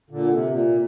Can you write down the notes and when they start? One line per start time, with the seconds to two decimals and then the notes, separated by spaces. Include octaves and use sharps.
0.10 A#2 D3
0.31 C3
0.51 A#2